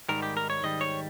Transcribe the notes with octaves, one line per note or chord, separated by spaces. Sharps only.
G#2 D#3 G3 A#4
G4
A#4
C#5
G#2 D#3 G3 D#5
C#5